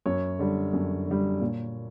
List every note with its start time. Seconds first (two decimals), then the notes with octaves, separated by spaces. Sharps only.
0.06 F#2 C#5
0.39 D3 G3
0.73 F#2
1.07 D3 G3
1.41 A#2